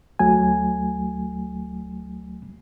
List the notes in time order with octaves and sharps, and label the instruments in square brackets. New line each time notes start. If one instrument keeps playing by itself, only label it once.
[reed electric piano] D2 F#3 A3 G#5